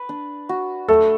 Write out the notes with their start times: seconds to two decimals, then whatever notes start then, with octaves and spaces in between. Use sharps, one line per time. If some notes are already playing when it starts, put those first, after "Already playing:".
Already playing: B4
0.09 D4
0.49 F#4
0.88 A3 A4